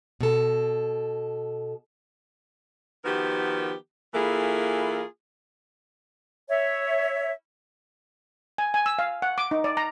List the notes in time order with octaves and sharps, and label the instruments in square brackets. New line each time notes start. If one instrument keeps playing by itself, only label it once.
[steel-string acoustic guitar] B2 A4
[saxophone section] D#3 F3 B3 F#4 G4 A#4
E3 A#3 E4 F4 G#4 A4
[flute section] C#5 E5
[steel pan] G#5
G#5
E6
F5
F#5
D6
D#4
D5
A#5